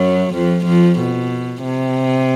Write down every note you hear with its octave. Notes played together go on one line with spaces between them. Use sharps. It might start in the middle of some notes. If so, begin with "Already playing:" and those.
Already playing: F#2 F#3
F2 F3
F2 F3
B2
C3